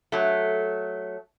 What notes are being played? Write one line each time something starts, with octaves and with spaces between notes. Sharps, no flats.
F#3 A3